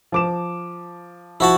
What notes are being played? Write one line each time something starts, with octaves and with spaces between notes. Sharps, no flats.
F3 D6 E7
F3 E4 F#4 A5